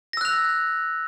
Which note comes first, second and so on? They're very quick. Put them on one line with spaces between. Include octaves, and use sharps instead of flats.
A#6 E6 F#6 F7